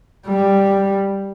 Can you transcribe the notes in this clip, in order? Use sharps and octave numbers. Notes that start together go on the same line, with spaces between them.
G3